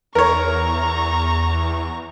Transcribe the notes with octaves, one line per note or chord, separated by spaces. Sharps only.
E2 A#4 C#5 A#5 C#6